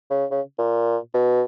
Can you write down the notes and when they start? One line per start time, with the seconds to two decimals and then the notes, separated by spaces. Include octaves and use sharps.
0.10 C#3
0.31 C#3
0.59 A#2
1.14 B2